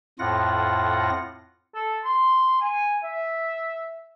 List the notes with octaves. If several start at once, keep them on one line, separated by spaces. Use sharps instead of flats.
F2 A2 F4 F#5 A#6
A4
C6
G#5
E5